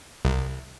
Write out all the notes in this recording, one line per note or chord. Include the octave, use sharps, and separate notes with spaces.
C2